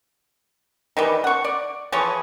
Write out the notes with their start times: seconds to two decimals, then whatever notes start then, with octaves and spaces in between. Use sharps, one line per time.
0.97 D#3 E3 G3
1.24 F#5 C#6
1.44 D5
1.92 E3 F3 G#4 C#5